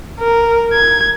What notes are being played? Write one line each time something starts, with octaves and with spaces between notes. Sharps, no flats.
A#4
G#6